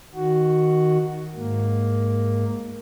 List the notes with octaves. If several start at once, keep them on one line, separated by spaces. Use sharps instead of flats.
D#3 F#4
G#2 A#3